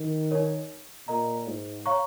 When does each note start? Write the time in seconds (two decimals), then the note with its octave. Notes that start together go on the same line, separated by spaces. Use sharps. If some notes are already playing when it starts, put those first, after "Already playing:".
Already playing: D#3
0.31 D#4 A#4 C#5
1.08 A#2 A#4 D#5 A#5
1.47 G#2
1.86 C#5 F5 A#5 C#6